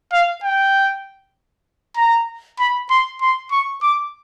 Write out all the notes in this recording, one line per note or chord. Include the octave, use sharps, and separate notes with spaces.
F5
G5
A#5
B5
C6
C6
C#6
D6